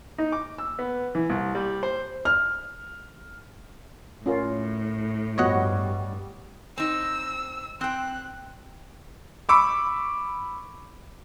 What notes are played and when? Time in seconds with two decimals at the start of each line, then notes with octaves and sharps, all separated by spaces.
0.18 D#4
0.32 D6
0.58 E6
0.79 B3
1.15 E3
1.30 C2
1.55 G3
1.83 C5
2.25 F6
4.26 A2 C#4 F4 A#4
5.38 G2 F3 G3 B3 F#4 C#5 D#5 F#5
6.78 C4 D#4 E6
7.81 C4 G5 F#6
9.49 B5 C#6 D6 E6